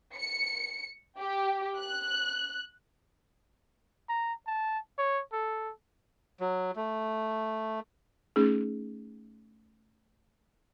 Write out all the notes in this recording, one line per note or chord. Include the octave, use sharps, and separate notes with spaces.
C#7
G4
F#6
A#5
A5
C#5
A4
F#3
A3
A3 C#4 D#4 G#4